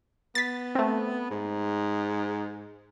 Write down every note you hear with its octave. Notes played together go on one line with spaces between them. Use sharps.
B3 A6 B6
A3 C4
G#2